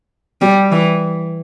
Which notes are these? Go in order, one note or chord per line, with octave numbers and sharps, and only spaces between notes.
G3
E3